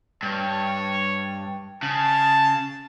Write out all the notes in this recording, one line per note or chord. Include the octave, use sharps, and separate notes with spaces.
G2 C#5
C#3 A5